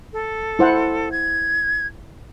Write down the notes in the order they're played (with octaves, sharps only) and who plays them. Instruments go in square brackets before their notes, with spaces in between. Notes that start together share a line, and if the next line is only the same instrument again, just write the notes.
[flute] A4
[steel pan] E4 C5 F#5
[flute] G#6